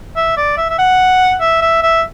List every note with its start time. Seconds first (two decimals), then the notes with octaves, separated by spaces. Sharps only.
0.16 E5
0.37 D5
0.57 E5
0.69 E5
0.79 F#5
1.40 E5
1.62 E5
1.83 E5